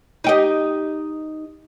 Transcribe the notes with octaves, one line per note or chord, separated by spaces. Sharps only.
D#4 G4 D#5